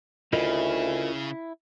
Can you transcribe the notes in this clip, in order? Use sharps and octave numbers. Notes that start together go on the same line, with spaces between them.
D2 C#3 E4 F4 A#4 D#5